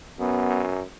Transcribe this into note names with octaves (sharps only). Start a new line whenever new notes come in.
F#2 B3